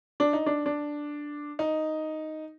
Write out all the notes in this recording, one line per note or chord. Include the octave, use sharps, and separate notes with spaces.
D4
D#4
D4
D4
D#4